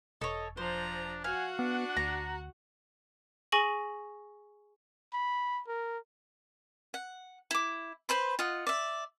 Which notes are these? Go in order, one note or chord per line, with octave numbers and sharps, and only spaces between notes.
E1 A4 C#5 D#5
F3 D4 C5 A#5
F#4 F5 F#5 G#5
B3 D4
D2 A#5
G#4 G#5 C#6 A#6 F#7
B5
A#4
F#5
E4 D6
B4 C5 B5 C6
F4 D#5 F#5
D5 E5